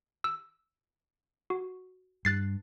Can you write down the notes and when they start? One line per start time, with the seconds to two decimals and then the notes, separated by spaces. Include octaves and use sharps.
0.24 E6
1.50 F#4
2.25 G2 F#6 A6 C7